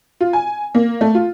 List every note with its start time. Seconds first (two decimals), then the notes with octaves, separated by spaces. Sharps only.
0.21 F4
0.33 G#5
0.75 A#3
1.01 A3
1.15 F4